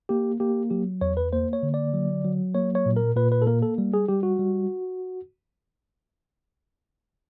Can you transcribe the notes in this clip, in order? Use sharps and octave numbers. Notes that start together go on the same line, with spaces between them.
A#3 G4
A#3 G4
F#3 G4
E2 C#5
B4
A#3 C5
C#5
D3
D5
F#3
F#3
A#3 C#5
C#5
A#2
A#4
A#2 B4
B4
A4
A#3 A#4
A4
G3
G#4
G3 G4
F#4
G3